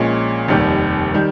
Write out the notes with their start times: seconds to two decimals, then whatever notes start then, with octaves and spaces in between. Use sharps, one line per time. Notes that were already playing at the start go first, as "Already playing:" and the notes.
Already playing: A#1 A#2 G#3 C#4
0.48 F1 D#2 D#3 G3
1.14 D#3 G3